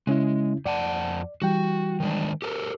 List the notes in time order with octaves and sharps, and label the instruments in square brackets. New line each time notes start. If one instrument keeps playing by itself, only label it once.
[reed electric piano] C#3 C#4 E4 [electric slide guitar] G#3
[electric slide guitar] F2 F#5 A5 [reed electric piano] D5
[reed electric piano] E3 G3 G5 [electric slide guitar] F#4
[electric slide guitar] D#3 G#3 D4
G4 A4 A#4